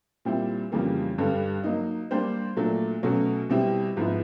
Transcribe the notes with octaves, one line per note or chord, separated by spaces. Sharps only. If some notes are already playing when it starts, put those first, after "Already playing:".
A#2 G3 C4 E4
F2 C#3 E3 G3 A#3
G2 D3 G3
F#3 A#3 D#4
G3 A#3 D4 G4 C5
A#2 F#3 A3 D4
B2 F#3 A3 C#4 F#4
B2 G3 C4 E4 G4
G#2 F3 G#3 B3 E4